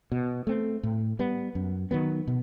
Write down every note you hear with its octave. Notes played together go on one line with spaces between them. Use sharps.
B2
A3 C4
A2
G3 B3
F#2
D#3 F#3 B3
B2